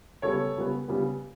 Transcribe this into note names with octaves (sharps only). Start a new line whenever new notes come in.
C#3 G3 B3 A4 C#5
C#3 G3 B3
C#3 G3 B3